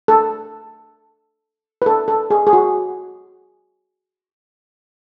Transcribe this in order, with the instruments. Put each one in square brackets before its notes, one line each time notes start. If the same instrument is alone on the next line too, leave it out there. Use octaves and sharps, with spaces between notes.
[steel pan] A4
B4
A4
A4
G#4
G#4
F#4